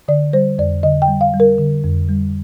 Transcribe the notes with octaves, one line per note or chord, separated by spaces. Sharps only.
D3 D5
G3 C5
F2 D5
D3 D#5
G5
G3
F5
G3
A#4
D3
F2
G3